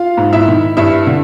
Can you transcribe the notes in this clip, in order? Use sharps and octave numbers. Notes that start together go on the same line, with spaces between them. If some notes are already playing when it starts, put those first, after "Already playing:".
Already playing: F4 F5
G#2
E4 E5
D#3
G2 E4 E5
D3